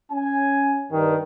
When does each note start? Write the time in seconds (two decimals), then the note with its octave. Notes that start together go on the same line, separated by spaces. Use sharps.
0.12 C#4 G#5
0.91 G2 D#3